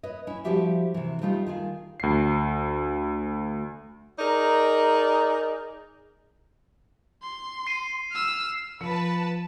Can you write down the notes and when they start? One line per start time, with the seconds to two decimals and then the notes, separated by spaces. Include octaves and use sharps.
0.03 B4 C#5 D#5
0.27 C#4 E4
0.44 F3 G3 E4 F#4 G4 E5
0.94 C3 E3
1.22 G3 A3 D#4 F4
1.46 D#3 F4 G#4
2.00 D2 C7
4.19 D#4 G#4 A#4 D5 D#5
7.22 C6
7.67 C7 D#7
8.11 E6 F6
8.81 F3 B4 A5 C#7